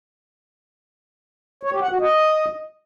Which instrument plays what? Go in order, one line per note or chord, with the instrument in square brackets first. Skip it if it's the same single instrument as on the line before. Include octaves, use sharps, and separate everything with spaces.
[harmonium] C#5
G4
F#5
F#4
D#5